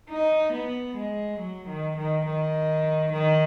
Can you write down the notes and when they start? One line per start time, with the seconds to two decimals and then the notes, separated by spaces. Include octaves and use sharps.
0.10 D#4
0.53 B3
0.97 G#3
1.40 F#3
1.69 D#3
1.98 D#3
2.27 D#3
3.13 D#3